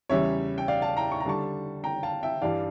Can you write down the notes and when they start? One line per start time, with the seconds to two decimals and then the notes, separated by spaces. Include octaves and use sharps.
0.09 E2 C#3 G3 C#4 C#5 E5
0.58 G5
0.68 D5 F5
0.82 F5 A5
0.97 G5 A#5
1.12 C#6
1.20 A#5
1.26 D3 G3 D4 A5 C#6
1.84 G5 A#5
2.03 F5 A5
2.23 E5 G5
2.42 G2 E3 G3 D4 D5 F5